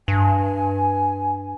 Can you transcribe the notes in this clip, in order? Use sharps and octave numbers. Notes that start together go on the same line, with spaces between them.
G2 G#5